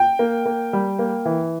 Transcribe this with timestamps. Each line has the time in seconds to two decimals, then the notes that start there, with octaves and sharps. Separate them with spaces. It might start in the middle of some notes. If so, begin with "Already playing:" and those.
Already playing: G5
0.19 A#3
0.46 A#3
0.73 G3
0.99 A#3
1.25 E3